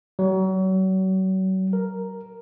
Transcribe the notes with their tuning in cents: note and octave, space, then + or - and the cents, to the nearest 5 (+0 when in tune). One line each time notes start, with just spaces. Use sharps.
F#3 +35
A#4 +0